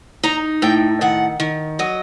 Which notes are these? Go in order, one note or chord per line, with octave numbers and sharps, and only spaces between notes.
D#4 A#5
A2 G5
D#3 F#5
D#3
F#3 D#5